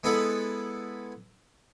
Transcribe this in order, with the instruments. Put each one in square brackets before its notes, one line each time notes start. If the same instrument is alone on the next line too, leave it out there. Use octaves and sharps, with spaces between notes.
[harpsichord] G#3 B3 E4 A4 D#5 F#5